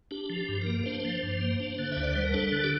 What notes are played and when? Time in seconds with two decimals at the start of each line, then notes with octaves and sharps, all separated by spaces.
0.11 D4 G4
0.30 F3
0.36 G4
0.49 G2
0.62 A#3 A#4
0.86 D4 C5
1.05 F3
1.23 G2
1.41 A#3
1.60 D4
1.79 D3
1.92 D2 E5
2.03 D5
2.13 G3 C5
2.24 A#4
2.34 D4 A4
2.52 D3
2.64 G4